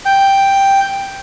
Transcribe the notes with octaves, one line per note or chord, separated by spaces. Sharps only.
G5